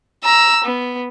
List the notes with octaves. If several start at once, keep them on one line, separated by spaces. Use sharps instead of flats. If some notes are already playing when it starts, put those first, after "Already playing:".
A#5 E6
B3